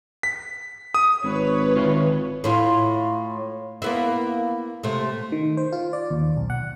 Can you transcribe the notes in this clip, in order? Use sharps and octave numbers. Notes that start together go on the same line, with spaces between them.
B6
D#6
G#1 B4 C#5
D#3 F4
A2 E4 F4
A#3 B3 E4
C3 A3
D#3
C5
F4
D5
D#2
B1
F#5